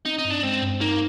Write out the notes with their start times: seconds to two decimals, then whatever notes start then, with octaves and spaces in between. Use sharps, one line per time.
0.05 C4 D#4
0.18 D#4
0.25 G2
0.31 D4
0.43 G#3 C4
0.62 G2
0.81 A#3 D#4